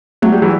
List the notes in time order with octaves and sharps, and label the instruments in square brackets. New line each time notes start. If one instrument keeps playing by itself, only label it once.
[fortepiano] F#3 [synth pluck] A3
[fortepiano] G3
E3 F#3